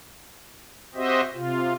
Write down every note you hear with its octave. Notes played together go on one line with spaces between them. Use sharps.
C4 F#4 G4 C5 D#5 E5
C3 F4